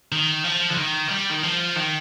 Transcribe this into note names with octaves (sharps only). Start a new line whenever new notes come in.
D#3
F3
D3
D#3
G3
D#3
F3
D#3